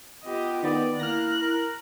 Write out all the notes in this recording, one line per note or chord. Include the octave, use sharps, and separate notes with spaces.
B3 F4 G4 D#5
D#3 B3 D5
A#3 E4 F6 F#6 A#6
A#4